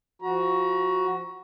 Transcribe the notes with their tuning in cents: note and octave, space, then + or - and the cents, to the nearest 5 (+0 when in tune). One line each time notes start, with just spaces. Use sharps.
F3 -5 F#4 +5 A#5 +35